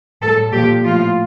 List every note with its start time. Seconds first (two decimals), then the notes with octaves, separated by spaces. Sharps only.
0.22 A2 G3 A4
0.52 A#2 F3 G4
0.84 A2 F3 F4